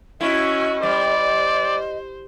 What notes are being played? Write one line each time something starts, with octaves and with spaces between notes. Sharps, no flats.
C#4 E4 F#4 D#5
G3 C5 D5